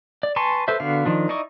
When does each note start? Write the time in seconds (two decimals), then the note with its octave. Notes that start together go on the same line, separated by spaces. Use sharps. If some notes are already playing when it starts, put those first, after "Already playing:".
0.23 D5
0.36 B4 G#5 A5 C6 C#6
0.68 A4 B4 C5 E5
0.80 D3 B3 F#4 F5
1.06 D#3 F3 D4
1.29 D#4 E4 D5 D#5 C#6